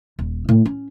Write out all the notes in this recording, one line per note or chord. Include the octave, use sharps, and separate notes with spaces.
D#1
A2
C#4